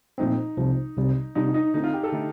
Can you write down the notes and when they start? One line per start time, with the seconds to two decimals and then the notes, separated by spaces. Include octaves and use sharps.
0.18 A#2 F3 A3 C4 D#4
0.57 C2 C3 F3
0.96 C2 C3 G3
1.35 C3 G3 D4 D#4 F4
1.54 D#4
1.74 D3 A3 C4 D#4
1.84 F4
1.94 G4
2.03 A4
2.13 D3 A3 D#4